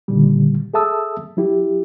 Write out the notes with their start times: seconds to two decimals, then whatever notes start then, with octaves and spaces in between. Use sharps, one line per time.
0.08 A#2 D3 D#3 G3
0.74 G#4 A4 E5 A5 D#6 E6
1.37 F#3 E4 G4